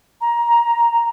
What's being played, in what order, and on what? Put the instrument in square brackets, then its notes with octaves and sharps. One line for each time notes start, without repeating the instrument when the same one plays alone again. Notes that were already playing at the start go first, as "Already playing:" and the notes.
[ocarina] A#5